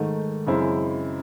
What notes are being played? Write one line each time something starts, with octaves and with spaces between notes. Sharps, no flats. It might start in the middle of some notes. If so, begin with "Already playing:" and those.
Already playing: G#2 D#3 A3
F#2 C#3 G#3 C4 E4